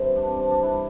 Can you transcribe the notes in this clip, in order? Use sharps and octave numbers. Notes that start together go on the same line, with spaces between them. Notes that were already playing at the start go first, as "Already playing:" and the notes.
Already playing: G2 E3 G3 C4 C5 D5
D4
C4
D4
D4
E4